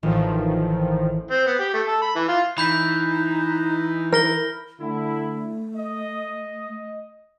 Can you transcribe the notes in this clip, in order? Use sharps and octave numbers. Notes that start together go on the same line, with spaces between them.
A1 D#3 F3
C4
B3
G4
A3
A4
B5
E3
F4
E3 D#4 B5 G6 B6
A#4 F6 A#6 G7
D3 A3 E4
D#5